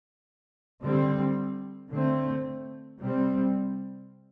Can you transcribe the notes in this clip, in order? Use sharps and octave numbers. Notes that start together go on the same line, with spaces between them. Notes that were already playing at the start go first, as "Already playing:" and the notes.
D3 G3 C4
D3 A3 C4
C3 G3 C4